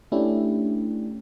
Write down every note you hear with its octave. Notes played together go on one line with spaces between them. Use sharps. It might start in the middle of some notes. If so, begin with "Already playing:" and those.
A3 C#4 D4 E4 G4